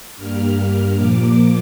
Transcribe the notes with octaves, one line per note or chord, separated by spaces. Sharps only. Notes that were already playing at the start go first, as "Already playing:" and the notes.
G2 G3 A#3 F6
A#2 F3 A#3 D6